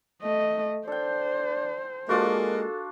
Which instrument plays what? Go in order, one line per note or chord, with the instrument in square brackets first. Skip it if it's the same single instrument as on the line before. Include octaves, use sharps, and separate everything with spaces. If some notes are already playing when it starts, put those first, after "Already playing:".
[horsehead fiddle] A3 D#5
[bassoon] D4 [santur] A4 G5 [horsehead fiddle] C5
[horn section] G#3 A#3 [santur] D4 F4 F#4 [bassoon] A4